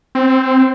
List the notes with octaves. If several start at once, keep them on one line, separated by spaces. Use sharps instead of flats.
C4